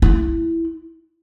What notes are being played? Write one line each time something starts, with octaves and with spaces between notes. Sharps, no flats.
E4